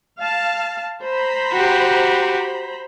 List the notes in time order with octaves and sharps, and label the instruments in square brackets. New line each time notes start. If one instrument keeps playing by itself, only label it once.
[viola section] F5 A5
C5 A#5 B5
[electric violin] F#4 G4